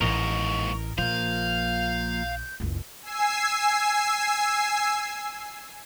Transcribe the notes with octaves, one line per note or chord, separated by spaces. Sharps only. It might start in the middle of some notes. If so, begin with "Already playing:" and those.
A1 D#2 G#2 A#4 D#5 C#6
A#1 F3 A#3 F5 G6
F#1 C#2
G#5 E6 C7